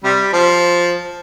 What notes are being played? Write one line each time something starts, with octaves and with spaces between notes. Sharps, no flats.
C3 G3
F3